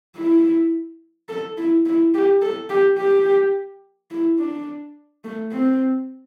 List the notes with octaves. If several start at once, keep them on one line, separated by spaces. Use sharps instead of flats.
E4
A4
E4
E4
G4
A4
G4
G4
E4
D4
A3
C4